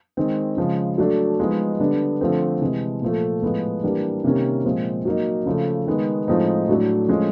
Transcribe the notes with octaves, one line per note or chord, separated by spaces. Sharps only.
D#3 G#3 C4
C#3 F3 G#3
F#3 A3 D4
F3 G#3 B3 D#4
D3 G3 B3 D4
D3 F3 A3 C4
C3 E3 G#3
A#2 F3 A3
A2 F3 G#3 B3
E3 G3 A#3 D4
C3 D#3 G3 A#3 C#4
A#2 F3 G#3 C4
F#3 A#3 D#4
C#3 F3 A3
D#3 G#3 B3
A2 F3 G#3 C4 D#4
A2 F#3 A3 D4
A2 F3 G#3 C#4